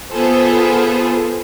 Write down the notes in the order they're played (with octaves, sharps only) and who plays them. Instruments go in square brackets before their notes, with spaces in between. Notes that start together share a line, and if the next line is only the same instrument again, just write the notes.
[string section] B3 F4 G#4 A4 C5